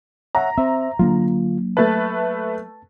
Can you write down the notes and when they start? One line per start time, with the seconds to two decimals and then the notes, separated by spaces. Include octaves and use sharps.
0.35 C#5 E5 F#5 A#5
0.58 C4 C5 E5
0.99 D3 F#3 A#3 D4 F4
1.77 A3 B4 A5 A6